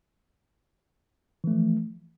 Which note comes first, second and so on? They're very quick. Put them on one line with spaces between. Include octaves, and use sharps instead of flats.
E3 A3 F3